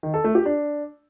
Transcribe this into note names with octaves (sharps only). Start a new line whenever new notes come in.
D#3
A4
A3
G4
D4